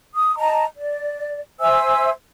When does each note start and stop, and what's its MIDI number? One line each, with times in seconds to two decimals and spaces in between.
0.14 0.35 87
0.37 0.65 75
0.37 0.65 81
0.37 0.65 82
0.77 1.40 74
1.60 2.11 72
1.60 2.11 76
1.60 2.11 80
1.60 2.11 88